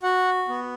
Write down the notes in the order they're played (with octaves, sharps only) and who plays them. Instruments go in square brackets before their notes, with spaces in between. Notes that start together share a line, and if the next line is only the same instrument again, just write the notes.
[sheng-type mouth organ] F#4 F#5
B3